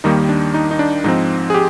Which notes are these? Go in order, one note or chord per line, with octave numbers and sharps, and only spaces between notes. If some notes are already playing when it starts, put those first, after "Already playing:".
D#2 D#3 G3 A#3 D#4
D4
D#4
D#4
D4
G#2 F3 C4 D#4
G#4
G4